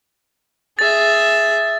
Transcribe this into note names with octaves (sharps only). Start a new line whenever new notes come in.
G#4 E5 A6